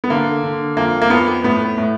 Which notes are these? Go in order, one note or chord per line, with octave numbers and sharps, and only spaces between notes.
B3
D3 A#3
D3
F2 A#3
A#3
F2 B3
A2 B3
A2